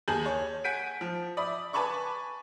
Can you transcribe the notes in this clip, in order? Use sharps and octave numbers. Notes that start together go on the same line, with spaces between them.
D#2 G#4 G#5 A5 G6 F#7
C#5
F#5 G#5 G6 B6 D7 D#7
F3
D5 E5 B5 D#6
B4 G#5 A5 B5 C#6 D6